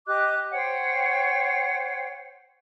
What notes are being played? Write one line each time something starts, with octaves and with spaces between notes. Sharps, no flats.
G4 D#5 D6 F#6
C5 C#5 F#5 G5